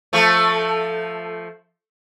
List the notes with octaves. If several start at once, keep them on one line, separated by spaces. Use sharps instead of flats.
F3 A3